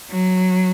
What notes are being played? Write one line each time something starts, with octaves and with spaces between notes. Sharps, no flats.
F#3